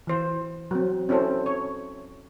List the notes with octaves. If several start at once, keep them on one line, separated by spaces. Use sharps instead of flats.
E3 C5
F#3 C4
C4 C#4 E4 A4 C5
C#5